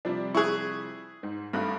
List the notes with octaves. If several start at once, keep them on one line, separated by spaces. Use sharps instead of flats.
C3 F3 G3 D4
E4 G#4 C#6 F#6
G#2
G#1 G2 A3 F#6